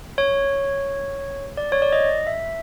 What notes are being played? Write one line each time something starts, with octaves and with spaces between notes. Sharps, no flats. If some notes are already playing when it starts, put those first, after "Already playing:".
C#5
D5
C#5
D5
D#5
E5